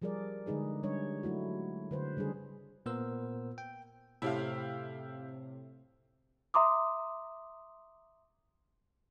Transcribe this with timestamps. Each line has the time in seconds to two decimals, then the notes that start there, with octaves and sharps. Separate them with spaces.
0.02 F3 G3 G#4 A#4 D5
0.46 D3 G#3 D#4 G#4 B4
0.83 G3 D4 C#5
1.23 F#3 A3 E4 F#4
1.91 D3 B4 C5
2.17 C#3 G3 D4 G#4
2.86 A#2 B3 A#4 C5 E6
3.58 G5
4.22 A2 C3 E4 G4 F5
6.54 E5 A#5 C6 D6 D#6